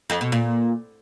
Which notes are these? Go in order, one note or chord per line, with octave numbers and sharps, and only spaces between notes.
F2
B2
A#2